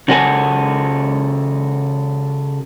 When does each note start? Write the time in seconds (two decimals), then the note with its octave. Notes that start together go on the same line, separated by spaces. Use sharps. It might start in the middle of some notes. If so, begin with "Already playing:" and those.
0.08 C#3 F#4 A4 G#5